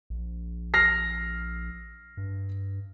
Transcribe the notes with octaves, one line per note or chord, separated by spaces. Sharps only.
A#1
F6 A#6 C7
G2